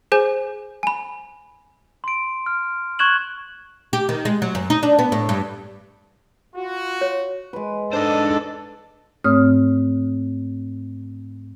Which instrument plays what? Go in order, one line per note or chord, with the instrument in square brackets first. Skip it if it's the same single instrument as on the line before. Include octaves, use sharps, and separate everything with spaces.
[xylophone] G#4 C5 G#5 G6
G#5 B5
[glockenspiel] C6 D7
F6
C#6 F#6 G#6 E7 F#7
[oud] G4
D#3
G#3
F#3
F#2
D#4
D4
B3
A2
G2
[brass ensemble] F4 F#4
[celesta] C#5
[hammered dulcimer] G#3 B4
[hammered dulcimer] G#2 [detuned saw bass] D4 [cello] A4 [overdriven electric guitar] C5 D#5
[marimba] G#2 A3 C4 C#5 D#6 F6